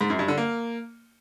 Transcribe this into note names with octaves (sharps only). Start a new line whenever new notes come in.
G#2
F#2
G2
D3
A#3